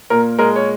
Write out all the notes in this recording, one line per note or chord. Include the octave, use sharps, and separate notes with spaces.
A#2 A#4
G#3 A#4
C#5